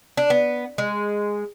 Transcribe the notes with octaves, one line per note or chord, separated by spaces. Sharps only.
D4
B3
G#3